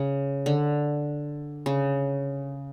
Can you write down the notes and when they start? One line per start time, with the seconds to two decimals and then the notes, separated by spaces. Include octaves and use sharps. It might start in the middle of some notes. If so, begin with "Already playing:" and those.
Already playing: C#3
0.46 D3
1.66 C#3